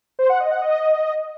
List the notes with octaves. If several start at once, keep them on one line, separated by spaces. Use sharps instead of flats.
C5
F#5
D#5
F#5
D#5